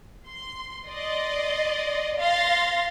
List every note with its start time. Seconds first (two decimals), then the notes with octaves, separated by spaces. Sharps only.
0.27 C6
0.87 D5 D#5 C6
2.18 F5 C6 A6 A#6